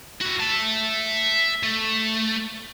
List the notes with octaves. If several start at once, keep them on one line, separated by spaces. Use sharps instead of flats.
E4 F#4
E5 A5
A3